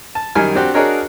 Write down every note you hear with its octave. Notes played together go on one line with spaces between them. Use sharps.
A5
F#2 D#3 G3 A#4 G#5 F6
C4 D4 F#4 G4
D4 F#4 G#4 A#4 C#5 D#5